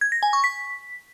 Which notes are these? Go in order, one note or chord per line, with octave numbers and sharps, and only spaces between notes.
G#6
A#6
G#5
C#6
B6